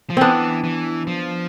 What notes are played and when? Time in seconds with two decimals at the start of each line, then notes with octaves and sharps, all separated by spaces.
0.10 F3
0.17 E3 B3 C4 D4
0.64 E3
1.07 F3